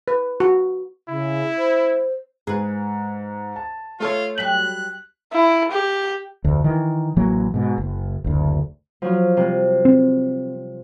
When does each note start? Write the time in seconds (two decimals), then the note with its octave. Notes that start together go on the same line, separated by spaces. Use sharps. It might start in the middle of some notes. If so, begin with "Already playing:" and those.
0.08 B4
0.40 F#4
1.09 C#3 E4
1.58 C5
2.47 G#2 G#4 B4
3.56 A5
4.00 A3 F4 A4 C#5
4.38 F#3 G3 F#6 B6 F#7
5.33 E4
5.71 G4
6.44 F1 D2
6.64 D#3 E3
7.16 A1 E3 F#3 A#3
7.54 G#2 B2
7.78 F#1
8.24 F#1 D2
9.02 F3 F#3 F4
9.37 C3 G3
9.85 C4